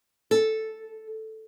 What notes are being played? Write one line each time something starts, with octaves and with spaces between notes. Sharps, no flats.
A4